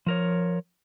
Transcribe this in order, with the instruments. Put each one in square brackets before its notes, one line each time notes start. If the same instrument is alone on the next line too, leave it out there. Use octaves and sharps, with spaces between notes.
[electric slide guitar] F3 A#4 C#5